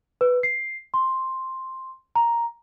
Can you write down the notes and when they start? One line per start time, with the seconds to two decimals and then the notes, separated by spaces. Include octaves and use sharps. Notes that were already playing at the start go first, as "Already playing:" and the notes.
0.21 B4
0.43 C7
0.94 C6
2.15 A#5